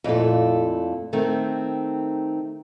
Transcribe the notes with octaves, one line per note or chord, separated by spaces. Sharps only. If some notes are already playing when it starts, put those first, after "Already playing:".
F2 A#2 A3 E4 A4
D#3 A3 C4